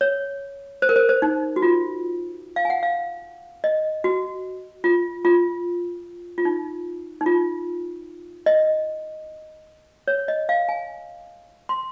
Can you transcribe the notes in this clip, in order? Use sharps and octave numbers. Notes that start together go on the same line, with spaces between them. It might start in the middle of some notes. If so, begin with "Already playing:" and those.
C#5
C5
A#4
C5
C5
D#4
F#4
F4
F5
G#5
F#5
F5
D#5
F#4
F4
F4
F4
D#4
D#4
F4
D#5
C#5
D#5
F5
G#5
C6